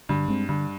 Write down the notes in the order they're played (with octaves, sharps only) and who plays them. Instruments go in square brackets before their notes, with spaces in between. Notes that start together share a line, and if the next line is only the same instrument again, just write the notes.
[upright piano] G2 [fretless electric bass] D3
[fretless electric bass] G#3 C4
[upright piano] G2 [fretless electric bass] D3